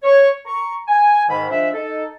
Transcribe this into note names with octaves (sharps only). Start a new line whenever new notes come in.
C#5
A#5 C#6
G#5
G#2 D#3 B5
F3 G#3 D4 C5 E5
D#4 A4